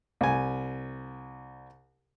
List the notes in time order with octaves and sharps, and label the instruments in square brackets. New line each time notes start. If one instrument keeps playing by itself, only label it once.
[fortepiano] C2 G#5